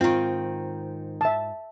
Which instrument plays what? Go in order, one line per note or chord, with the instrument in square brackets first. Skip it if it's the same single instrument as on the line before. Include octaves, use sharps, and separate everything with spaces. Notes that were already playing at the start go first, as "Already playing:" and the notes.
[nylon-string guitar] G#2 F4 [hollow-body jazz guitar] D#3 C4
[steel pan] E5 A5